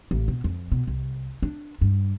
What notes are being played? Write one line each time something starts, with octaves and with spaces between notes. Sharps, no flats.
A1
B2
F2
B2
C2
D4
G2